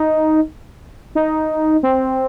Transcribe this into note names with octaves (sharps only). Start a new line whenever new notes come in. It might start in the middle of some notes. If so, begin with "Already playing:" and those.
Already playing: D#4
D#4
C4